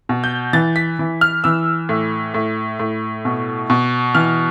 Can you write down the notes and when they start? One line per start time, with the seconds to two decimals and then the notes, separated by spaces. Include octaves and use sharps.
0.09 B2
0.24 G6
0.53 E3 A6
0.76 B6
0.99 E3
1.21 F6
1.44 E3 E6
1.89 A2
2.34 A2
2.80 A2
3.25 B2
3.70 B2
4.15 E3 F6